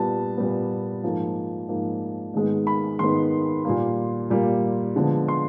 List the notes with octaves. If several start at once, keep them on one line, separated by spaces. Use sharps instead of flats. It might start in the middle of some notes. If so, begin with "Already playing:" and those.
Already playing: A#2 G3 B3 A5
A#2 G3 B3
G#2 F3 A#3
G#2 F3 A#3
G#2 D#3 G#3 B3
B5
G#2 D#3 G#3 B3 C6
A#2 G3 A#3
A#2 G3 A#3
D3 F3 G#3 B3
C6